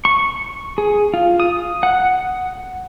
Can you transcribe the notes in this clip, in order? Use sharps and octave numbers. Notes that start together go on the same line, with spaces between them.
C#6
G#4
F4
D#6
F#5